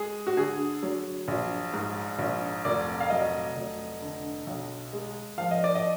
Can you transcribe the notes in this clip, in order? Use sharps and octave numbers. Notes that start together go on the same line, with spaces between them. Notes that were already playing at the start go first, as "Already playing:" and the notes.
Already playing: G#3 G#4
F#4
D3 G#4
F#3
A#1
G#2
A#1
F1 D5
F5
F#3 D#5
F1
D3
B1
G#3
F3 F5
D#5
D5
D#5